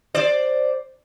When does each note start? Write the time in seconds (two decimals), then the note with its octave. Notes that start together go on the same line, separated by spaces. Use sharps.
0.15 C5 D5